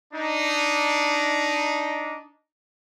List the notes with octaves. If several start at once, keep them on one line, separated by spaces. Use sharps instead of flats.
D4 D#4